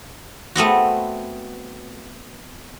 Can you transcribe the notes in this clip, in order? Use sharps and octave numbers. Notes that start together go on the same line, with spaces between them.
A3 B3 C4 F#4